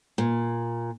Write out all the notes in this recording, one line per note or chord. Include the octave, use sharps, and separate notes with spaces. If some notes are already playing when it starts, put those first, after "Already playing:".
A#2